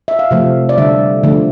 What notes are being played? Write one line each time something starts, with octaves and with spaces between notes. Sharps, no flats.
E5
F5
C3 F3 A3
D5
D3 G3 E5
D3 F3 A3